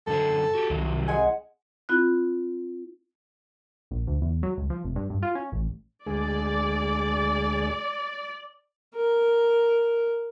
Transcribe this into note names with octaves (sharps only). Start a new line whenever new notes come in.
F#2 D3 A4 C5
F#4 G4
C2 D#3 F#3
G#3 F#5 G#5
C4 E4 F4 B5 F#6
A#1
D2
E2
F#3
C#2
F3
F1
G2
G2
F4
C#4
A1
D2 G#3 G#4 D5
A#4